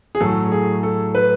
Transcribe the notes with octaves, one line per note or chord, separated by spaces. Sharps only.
G#4
A2 F#3 A3 A4
G#4
A4
B4